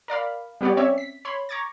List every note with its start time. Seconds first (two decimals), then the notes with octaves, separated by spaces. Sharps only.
0.08 A#4 D5 F5 B5
0.61 G3 B3 G4 C#5 D5
0.77 C4 C#4 C#5 D5 E5
0.98 B6
1.25 C#5 B5 C6
1.49 A#5 C#6 D6 G#6 A6